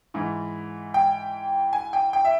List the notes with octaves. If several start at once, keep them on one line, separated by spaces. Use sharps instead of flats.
G#2 E3
G5
G#5
G5
G5
E5